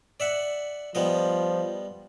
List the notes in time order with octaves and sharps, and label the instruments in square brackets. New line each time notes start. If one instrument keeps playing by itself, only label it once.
[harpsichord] D5 E5 F#5
[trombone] F3 [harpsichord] G3 B3 D#5